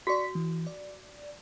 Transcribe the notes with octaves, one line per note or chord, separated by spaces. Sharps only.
F#4 D5 C#6 B6
E3
D5